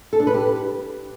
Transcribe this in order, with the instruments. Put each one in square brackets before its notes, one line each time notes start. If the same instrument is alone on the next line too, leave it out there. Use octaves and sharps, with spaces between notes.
[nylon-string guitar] A4
D4
B4
G4